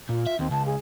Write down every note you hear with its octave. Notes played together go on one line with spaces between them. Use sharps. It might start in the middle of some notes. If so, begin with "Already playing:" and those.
A#2 F4
E5
D#2 C4
C#2 A5
G#4